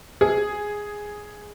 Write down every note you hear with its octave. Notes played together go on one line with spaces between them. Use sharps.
G#4